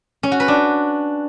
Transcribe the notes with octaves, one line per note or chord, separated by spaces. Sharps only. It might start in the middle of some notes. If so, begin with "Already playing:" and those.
C#4
F#4
B4
D4